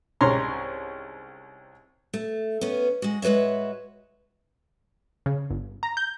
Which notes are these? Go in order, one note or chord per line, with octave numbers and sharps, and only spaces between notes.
C2 G#2 C#4 C#5 A#5 C6
A3
B3 C#4
G#3 F#4
G#3 F#4 B4 C#5 E5
C#3
G1
A#5
G6